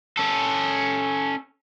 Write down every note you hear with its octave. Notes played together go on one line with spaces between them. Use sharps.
C#4 A4